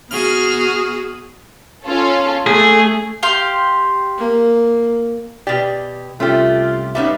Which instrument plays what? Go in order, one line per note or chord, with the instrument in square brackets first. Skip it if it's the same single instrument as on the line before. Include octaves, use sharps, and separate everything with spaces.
[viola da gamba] B3 F#4 G#4 [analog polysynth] F6
[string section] C#4 F4 A4
[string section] A3 [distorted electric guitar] G#4
[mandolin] G4 F5 C6
[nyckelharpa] A#3
[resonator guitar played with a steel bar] B2 G4 [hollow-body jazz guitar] D5
[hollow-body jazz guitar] C2 C#4 A4 [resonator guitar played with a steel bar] A3 G4 [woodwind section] F4
[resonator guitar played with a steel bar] G3 B3 D#4 [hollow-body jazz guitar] C#4 E5 [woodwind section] F5